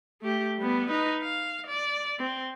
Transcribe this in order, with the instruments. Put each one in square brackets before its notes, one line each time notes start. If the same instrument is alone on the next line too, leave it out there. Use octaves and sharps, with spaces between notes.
[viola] A3 G4
G3 B3
D#4 B4
F5
D5
C4